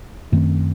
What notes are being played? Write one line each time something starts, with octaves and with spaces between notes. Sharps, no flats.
F#2 D#3 A3 C4